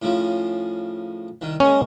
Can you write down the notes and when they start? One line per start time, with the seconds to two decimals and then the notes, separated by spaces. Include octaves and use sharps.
0.02 A2 C#3 F3
1.41 C2 D#3
1.60 G#3 A#3 C#4